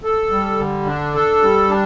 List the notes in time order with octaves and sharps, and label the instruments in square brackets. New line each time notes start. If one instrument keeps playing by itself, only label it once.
[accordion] A4
G3
D3
D4
A4
G3
D4